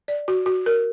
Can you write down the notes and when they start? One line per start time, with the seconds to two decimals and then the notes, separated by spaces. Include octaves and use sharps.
0.08 D5
0.28 F#4
0.46 F#4
0.66 A#4